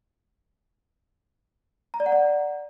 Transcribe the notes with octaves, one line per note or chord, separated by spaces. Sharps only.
A#5
D5
F#5
D5